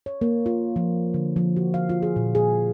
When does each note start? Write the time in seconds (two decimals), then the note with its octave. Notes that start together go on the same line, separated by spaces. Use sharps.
0.06 C#5
0.21 A#3
0.46 F4
0.76 F3
1.14 D3
1.36 F3
1.56 F#4
1.74 F5
1.89 F4
2.02 G#4
2.16 A#2
2.35 G#4